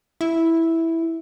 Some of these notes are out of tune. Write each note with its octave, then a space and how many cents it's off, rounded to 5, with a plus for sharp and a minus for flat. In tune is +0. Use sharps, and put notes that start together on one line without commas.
E4 -5